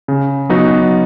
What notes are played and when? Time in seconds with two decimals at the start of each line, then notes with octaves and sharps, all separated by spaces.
0.08 C#3
0.49 F#3 B3 D#4 F#4